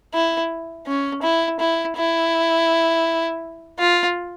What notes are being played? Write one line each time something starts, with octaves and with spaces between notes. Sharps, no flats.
E4
C#4
E4
E4
E4
F4